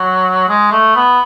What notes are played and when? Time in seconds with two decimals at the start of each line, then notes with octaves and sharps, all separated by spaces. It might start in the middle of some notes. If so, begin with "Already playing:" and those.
Already playing: F#3
0.48 G#3
0.71 A3
0.95 B3